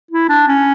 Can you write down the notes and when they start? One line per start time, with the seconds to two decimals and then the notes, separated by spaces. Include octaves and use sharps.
0.11 E4
0.29 D4
0.48 C#4